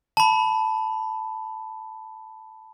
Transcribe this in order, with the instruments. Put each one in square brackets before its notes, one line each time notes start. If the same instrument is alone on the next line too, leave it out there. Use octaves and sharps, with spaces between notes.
[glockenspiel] A5 B5